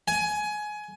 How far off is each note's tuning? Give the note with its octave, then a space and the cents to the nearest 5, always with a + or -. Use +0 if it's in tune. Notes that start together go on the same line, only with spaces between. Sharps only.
G#5 +20